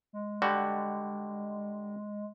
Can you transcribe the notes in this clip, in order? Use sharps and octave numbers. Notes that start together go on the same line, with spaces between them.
G#3
D3 G3 F#4